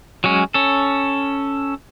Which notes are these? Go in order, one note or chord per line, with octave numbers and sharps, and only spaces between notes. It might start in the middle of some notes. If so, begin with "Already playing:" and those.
F#3 G#3 C#4
C#4 A4